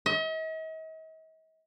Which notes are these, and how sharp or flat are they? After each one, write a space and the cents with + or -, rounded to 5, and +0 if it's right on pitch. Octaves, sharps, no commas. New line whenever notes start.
D#5 +45